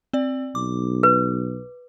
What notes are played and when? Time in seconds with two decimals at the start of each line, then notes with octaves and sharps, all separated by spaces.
0.13 C4 D5
0.55 B1 D6
1.03 B4